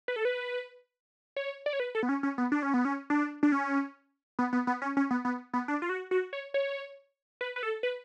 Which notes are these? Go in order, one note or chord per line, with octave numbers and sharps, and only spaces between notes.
B4
A4
B4
C#5
D5
C#5
B4
A4
B3
C#4
C#4
B3
D4
C#4
B3
C#4
D4
D4
C#4
B3
B3
B3
C#4
C#4
B3
B3
B3
D4
F4
F#4
F#4
C#5
C#5
B4
B4
A4
B4